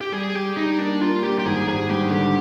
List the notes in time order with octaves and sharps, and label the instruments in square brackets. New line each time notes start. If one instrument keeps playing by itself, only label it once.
[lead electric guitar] G4
[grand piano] G3 [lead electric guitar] G#4
[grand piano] G3 [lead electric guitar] G4
[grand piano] G3 [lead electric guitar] D#4
[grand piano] A#3 [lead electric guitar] D4
[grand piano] A#3 [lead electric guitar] F4
[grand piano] G3 [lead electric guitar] G4
[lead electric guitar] G4
[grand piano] G#1 [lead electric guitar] G#4
[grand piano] G#1 [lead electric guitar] G#4
[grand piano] G2 [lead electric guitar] G4
[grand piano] D3 [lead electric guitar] G4